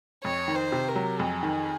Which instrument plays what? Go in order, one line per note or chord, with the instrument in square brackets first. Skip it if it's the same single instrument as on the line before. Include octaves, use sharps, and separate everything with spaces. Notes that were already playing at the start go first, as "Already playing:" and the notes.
[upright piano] F2 [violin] C#5
[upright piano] D#3
[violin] C5
[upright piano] C3
[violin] A#4
[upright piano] F#3
[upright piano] F2 [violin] G#4
[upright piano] D#3